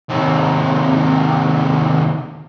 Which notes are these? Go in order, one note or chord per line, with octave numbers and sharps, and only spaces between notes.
D#2 C3